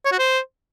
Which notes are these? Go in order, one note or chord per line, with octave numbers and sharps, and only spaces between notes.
C#5
F#4
C5